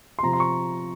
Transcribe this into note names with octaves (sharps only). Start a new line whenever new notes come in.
C6
C3 F3 A#5
C6
C#6